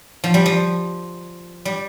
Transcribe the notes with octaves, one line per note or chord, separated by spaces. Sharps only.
F3
G3
F3
G3